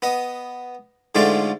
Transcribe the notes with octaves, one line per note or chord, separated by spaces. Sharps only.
B3 D#5
G#2 D3 G#3 A3 F4 D5